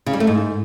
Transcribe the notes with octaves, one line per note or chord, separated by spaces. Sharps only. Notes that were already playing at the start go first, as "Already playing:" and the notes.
C#3
G3
A3
G#2